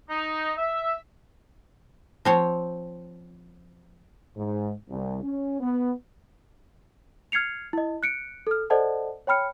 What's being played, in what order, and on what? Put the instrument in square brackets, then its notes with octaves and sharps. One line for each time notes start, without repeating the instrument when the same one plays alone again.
[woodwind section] D#4
E5
[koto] F3 C4 C#5
[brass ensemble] G#2
C2
C#4
B3
[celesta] F6 G#6 C7 C#7 F7
E4 D#5
F#6 C#7 D7
A4 F6
A4 C5 D5 D#5 F#5 A5
C#5 G5 B5 F6 C#7